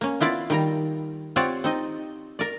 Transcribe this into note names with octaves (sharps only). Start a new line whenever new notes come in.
A#3 C#4
B3 E4 F4 D5
D#3 G3 A#5
C4 F4 G4 C#5 D5 F#5
C4 D#4 D#5
A#4 D5